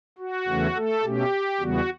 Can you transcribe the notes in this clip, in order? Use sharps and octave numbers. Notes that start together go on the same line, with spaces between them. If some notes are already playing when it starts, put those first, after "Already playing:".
F#4
E2 C#3 E3 A3 C#4
A3 A4
B2 A3 C#4 G4
E2 C#3 E3 G3 B3 F#4